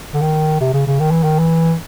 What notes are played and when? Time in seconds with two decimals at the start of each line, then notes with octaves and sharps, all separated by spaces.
0.14 D3
0.21 D#3
0.61 C3
0.74 C#3
0.87 C#3
1.00 D#3
1.11 E3
1.23 D#3
1.39 E3